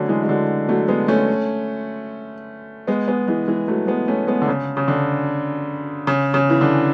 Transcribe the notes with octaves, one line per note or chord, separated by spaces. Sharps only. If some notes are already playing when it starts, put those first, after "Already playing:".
Already playing: D3 F#3 A3 C#4
E3 G#3
G#3
D3 F#3
F#3 A3
G#3 B3
A3 C#4
G#3 B3
G#3 B3
E3 G#3
E3 G#3
F#3 A3
G#3 B3
A3 C#4
G#3 B3
D3
C#3
C#3
D3
C#3
C#3
E3
D3